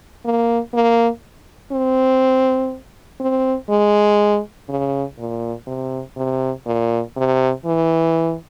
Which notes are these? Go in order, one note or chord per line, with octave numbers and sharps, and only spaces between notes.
A#3
A#3
C4
C4
G#3
C#3
A#2
C3
C3
A#2
C3
E3